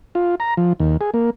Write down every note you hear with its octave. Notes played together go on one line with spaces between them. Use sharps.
F4
A#5
F3
D#2
G#4
A#3